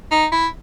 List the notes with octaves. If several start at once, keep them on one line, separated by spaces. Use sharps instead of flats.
D#4
E4